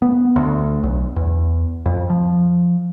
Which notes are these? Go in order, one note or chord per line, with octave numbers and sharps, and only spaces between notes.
B3
D2
B1
E2
F2
F3